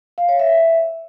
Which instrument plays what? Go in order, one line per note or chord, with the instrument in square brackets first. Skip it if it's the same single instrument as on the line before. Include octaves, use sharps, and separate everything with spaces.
[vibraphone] F5
C#5
E5